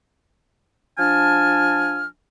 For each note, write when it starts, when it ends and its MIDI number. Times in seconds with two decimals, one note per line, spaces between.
0.99 2.06 53
0.99 2.06 62
0.99 2.06 80
0.99 2.06 81
0.99 2.06 89